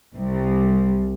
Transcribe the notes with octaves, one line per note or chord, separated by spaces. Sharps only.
C2